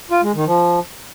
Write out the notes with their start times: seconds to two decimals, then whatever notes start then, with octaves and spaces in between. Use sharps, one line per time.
0.11 F4
0.23 G#3
0.35 D#3
0.46 F3